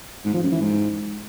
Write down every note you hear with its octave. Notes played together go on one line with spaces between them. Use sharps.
G#2
F3
F#2
E3
G#2